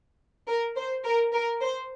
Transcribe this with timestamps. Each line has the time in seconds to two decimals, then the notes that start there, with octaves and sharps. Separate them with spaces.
0.48 A#4
0.76 C5
1.04 A#4
1.32 A#4
1.61 C5